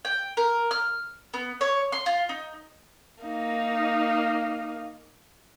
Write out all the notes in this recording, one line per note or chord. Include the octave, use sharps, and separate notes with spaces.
G5
A#4
F6
B3
C#5
C6
F4
D#4
A#3 D#4